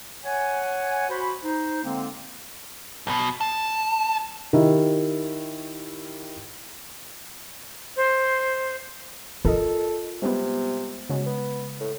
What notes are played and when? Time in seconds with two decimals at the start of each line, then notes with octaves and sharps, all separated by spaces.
0.25 C#5 F#5 G#5
1.10 F#4 C5 B5
1.43 D#4 C5
1.84 D3 G#3 A#3 C4
3.07 B1 B2
3.41 A5
4.53 D#3 E4 G4
7.96 C5
9.45 F4 A4 A#4 D#5
10.22 C3 G3 G#3 B3
11.09 C#3 F#3 G#3
11.26 B3
11.80 A2